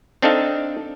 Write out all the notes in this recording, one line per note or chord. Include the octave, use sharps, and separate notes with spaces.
C4 D4 D#4 A4 D#5 F5